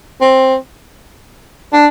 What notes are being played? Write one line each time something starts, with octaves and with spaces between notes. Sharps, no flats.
C4
D4